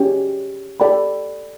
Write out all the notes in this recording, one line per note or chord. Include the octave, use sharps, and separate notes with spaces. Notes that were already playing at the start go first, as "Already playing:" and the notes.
Already playing: C#4 G4 C#5 G5
A4 D5 G5 B5